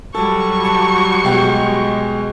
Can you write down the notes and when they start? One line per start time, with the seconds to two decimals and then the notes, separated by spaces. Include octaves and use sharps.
0.15 F#3 G3 A4 C#6
0.64 A5
1.24 B2 G#3 G4